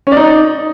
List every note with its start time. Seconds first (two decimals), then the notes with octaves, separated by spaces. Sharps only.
0.07 C#4
0.12 D5
0.17 D#4